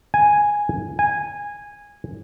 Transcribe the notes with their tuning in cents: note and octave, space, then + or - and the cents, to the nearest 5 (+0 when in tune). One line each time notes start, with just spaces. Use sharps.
G#5 +0
G#5 -10